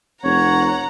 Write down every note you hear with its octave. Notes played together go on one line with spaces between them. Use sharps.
F1 C#5 F#5 A#5